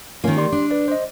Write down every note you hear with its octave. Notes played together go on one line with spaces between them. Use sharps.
D#3 A#3 C#4 F4
G4 D5 C6
D4
B4 D5
C5 D#5